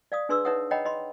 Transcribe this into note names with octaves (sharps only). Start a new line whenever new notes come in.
D5 F5 D#6
D4 G#4 B4 C6 D6 E6
D#4 B4 C#5 E5 F#5 D#6
C#5 D#5 F#5 G5 A#5 B5
D#5 B5 C6